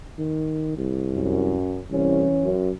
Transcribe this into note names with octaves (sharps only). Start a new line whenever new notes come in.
D#3
C2
F#2
C2 E3 C#4
F#2